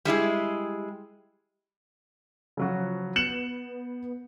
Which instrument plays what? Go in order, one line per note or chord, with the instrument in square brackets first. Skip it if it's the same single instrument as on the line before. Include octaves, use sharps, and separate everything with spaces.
[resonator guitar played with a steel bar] G3 G#3 E4 G#4
[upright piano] C#3 F#3 F#4 [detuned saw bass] F3
[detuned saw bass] B3 [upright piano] C#7 E7 F#7